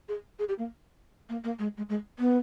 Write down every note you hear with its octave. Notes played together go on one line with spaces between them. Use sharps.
G#4
G#4
G4
A#3
A#3
A#3
G#3
G#3
G#3
B3